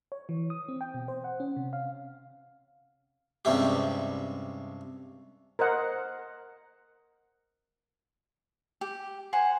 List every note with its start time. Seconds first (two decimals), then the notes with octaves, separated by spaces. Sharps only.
0.12 C#5
0.29 E3
0.50 D#6
0.68 C4
0.81 G5
0.94 B2
1.08 C5
1.24 F#5
1.40 C#4
1.56 C3
1.73 F5
3.45 C#2 G2 C3 E4 G4
5.59 A#4 C5 D#5 F#5
8.81 G4
9.33 C5 F#5 G#5 C6